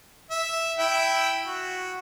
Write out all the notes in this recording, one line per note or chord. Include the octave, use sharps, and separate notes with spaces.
E5
E4 E5 G5
F#4